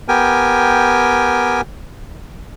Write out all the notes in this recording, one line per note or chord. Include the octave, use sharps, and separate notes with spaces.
B3 G4 A#4 G5 G#5